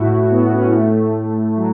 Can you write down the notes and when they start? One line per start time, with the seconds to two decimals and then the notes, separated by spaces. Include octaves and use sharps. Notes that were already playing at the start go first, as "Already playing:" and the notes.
Already playing: A2 E4 F#4
0.31 B3
0.53 C#4
0.63 B3
0.73 A3
1.56 F#3